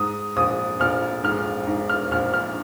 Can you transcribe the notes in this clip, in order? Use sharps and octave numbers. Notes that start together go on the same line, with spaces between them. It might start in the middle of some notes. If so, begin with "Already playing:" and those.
Already playing: G#2 D#6
A#1 D#6
A#1 F6
G#2 F6
G#2
F6
A#1 F6
F6